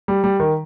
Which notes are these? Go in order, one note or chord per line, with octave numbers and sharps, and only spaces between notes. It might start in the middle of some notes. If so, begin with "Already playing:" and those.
G3
G3
D#3